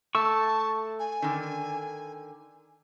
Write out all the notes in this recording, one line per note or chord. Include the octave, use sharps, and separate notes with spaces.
A3 A5 C#6 E6
G#5
D3 D#3